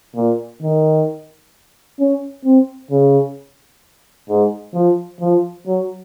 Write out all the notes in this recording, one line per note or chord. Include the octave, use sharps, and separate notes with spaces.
A#2
D#3
C#4
C4
C#3
G#2
F3
F3
F#3